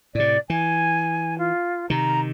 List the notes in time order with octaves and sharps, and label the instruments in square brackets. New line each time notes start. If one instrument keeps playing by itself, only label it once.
[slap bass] A2 C3 [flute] D5
[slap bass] E3 [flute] G#5
[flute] F4
[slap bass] C3 D#3 [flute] A#5